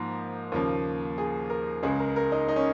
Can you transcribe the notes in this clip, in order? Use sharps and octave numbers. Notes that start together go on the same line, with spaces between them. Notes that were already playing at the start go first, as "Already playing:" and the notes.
Already playing: G#2 F3 A#3 A#4
D#2 C#3 F3 A#3
G#4
A#4
C#2 C#3 G#3 G#4
A#4
A#4
D#4
D#4
C#4